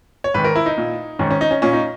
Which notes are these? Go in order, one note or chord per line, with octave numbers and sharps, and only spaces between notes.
C#5
G#2 D#3 B4
A#4
E4
D#4
A#2
G#2 D#3 C#4
C#4
D#4
C#4
A#2 C#4
D#4